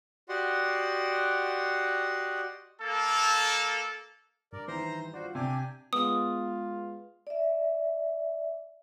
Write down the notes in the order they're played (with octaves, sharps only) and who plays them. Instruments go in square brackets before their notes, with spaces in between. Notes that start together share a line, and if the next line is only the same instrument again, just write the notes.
[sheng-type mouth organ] F#4 G4 D5 D#5 F#5 C6
[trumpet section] A#3 A4
[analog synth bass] G2 [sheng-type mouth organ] A#4 D5
[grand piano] D#3 E3 [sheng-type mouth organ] C5 A#5 C6
[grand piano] F4 D5 [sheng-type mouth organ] F#4 C5
[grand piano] C3 [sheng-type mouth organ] D4 G4 G#5
[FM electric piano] G#3 B3 [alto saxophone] F4 [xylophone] D#6
[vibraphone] D5 E5